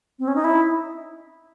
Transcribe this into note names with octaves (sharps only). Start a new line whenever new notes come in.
C4
C#4
D#4
E4